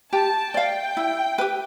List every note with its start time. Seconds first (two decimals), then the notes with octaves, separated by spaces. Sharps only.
0.12 G4 A5
0.54 D5 F5 G5
0.97 E4
1.38 G4 B4